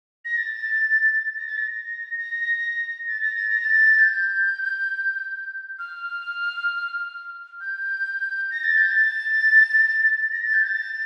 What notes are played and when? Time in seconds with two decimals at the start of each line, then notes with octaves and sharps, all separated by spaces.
0.25 A#6
0.37 A6
1.37 A#6
1.47 A6
1.56 A#6
2.17 A#6
3.07 A6
3.22 A#6
3.36 A6
3.50 A#6
3.64 A6
3.99 G6
5.79 F6
7.61 G6
8.51 A#6
8.64 A6
8.77 G6
8.91 A6
10.32 A#6
10.44 A6
10.54 G6
10.65 A6